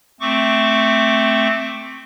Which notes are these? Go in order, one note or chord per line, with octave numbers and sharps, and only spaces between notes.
A3 C4 C#6 D6